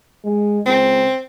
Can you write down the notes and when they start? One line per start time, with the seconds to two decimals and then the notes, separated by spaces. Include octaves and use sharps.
0.24 G#3
0.66 C#2 C4